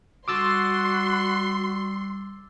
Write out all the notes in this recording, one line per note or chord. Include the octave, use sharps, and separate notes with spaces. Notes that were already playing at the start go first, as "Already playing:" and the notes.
G3 F#4 C6 D6 E6 A6